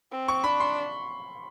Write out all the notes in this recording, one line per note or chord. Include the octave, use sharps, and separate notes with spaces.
C4
C#6
D4 B5
C6